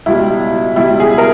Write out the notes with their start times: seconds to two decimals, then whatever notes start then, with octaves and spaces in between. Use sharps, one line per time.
0.06 C#2 B2 G3 E4
0.76 C#2 B2 G3 E4
1.00 G#4
1.18 A#4